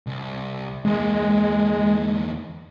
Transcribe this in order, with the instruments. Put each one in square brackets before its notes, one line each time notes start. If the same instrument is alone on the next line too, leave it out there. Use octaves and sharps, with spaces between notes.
[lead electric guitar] C2
[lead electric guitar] E2 A#3 [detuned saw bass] G#3